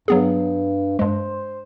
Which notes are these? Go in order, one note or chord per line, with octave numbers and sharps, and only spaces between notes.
G2 F#3 B3 G#4
G2 G#3 C5